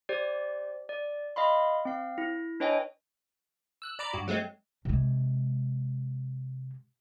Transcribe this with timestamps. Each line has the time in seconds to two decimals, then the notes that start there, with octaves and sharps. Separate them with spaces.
0.09 G4 C5 D5
0.89 D5
1.36 D#5 F5 B5 C6
1.85 C4 F5
2.18 E4
2.60 D4 B4 C#5 D#5 G5 G#5
3.82 E6 F#6
3.99 D5 A#5 B5 D6
4.13 G2 F#4
4.28 F#3 G#3 A3 C4
4.85 C3 G#3